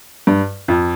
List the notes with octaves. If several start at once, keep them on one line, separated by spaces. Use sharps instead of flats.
G2
F2